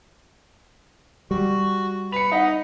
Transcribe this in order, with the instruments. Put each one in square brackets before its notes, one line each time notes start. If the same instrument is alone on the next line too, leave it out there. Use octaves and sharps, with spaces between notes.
[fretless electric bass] G3 [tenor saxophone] F#4
[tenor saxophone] B4 [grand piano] C#7 F7
[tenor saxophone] D#4 [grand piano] D#5 F#5